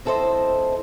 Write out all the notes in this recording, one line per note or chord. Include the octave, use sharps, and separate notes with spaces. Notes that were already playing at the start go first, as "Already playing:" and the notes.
C4 E4 A4 A#4 C5 D#5